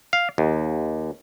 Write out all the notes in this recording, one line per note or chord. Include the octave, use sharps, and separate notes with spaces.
F5
D#2